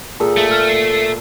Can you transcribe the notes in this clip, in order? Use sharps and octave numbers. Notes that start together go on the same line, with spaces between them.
A#2 G#4 A4
A3
F6
C7